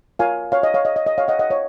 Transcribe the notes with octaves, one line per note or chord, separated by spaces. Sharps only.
F4 A#4 C#5 F5 G#5
C#5 F5
D#5
C#5 F5
D#5
D#5
D#5
C#5 F5
D#5 F#5
D#5 F#5
F4 C5 C#5 F5